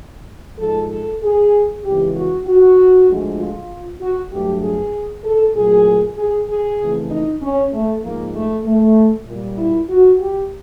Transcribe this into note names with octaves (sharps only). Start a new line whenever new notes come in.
G#2 F3 G#3 A4
A4
G#4
F2 C#3 E3 G#3 G4
F#4
F#4
D2 D3 F3 G#3
F4
F#4
G2 D3 F#3 A3 G4
G#4
A4
A#2 F#3 A3 G#4
G#4
G#4
F2 C#3 E3 A3
D#4
C#4
A3
G#2 F3 G#3 A#3
A3
A3
A#2 G3
E4
F#4
G4